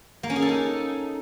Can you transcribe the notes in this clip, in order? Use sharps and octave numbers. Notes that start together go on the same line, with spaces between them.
A#3
C#4
G#4
A4
D#4